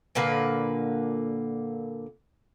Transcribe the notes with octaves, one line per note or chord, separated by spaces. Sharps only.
A#2 D3 A#3 B4